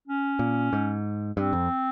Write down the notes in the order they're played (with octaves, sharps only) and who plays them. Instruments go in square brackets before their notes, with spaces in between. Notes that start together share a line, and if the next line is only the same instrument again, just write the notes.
[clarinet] C#4
[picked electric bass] A#2
G#2
[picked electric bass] G2 [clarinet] C4
[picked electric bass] F2